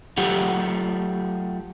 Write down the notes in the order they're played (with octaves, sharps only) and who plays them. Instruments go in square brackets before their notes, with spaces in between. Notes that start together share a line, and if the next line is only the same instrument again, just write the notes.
[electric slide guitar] F#3 A3 F4 G4 F#5